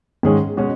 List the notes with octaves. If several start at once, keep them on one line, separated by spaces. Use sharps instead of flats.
G#2 D#3 G#3 C#4 G#4
B2 G#3 C#4 F#4